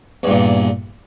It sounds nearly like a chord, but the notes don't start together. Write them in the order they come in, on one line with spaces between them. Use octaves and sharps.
E2 G2 A#2